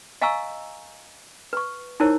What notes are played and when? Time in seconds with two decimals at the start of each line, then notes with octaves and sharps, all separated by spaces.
0.21 D#5 F5 G#5 A#5 C#6 E6
1.53 B4 C#6
2.00 D#4 E4 A#4 C5 C#5